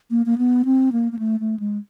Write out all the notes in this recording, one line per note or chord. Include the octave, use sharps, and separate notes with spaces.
A#3
A#3
B3
C4
A#3
A#3
A3
A3
G#3